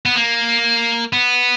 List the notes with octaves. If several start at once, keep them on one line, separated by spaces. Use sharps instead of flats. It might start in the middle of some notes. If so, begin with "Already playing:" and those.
B3
A#3
B3